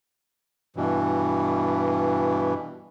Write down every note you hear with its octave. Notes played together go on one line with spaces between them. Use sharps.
G2 B2 E3